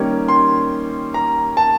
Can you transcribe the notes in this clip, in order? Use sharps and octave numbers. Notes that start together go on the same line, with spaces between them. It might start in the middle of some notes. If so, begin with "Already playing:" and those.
Already playing: D#3 G3 A#3 C#4
C6
A#5
A5